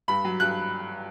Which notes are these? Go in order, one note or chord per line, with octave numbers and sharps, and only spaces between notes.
G2 B5
F#3
G2 F#6